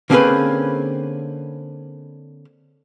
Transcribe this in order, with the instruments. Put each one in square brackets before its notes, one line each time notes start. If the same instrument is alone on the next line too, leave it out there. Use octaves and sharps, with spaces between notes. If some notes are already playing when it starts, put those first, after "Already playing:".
[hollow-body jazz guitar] D3 A#3 C4 C#4 G#4 B4